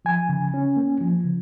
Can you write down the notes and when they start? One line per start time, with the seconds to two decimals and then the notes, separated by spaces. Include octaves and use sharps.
0.05 F3 G#5
0.29 C#3
0.54 C#4
0.77 A#3
1.01 F3
1.24 C#3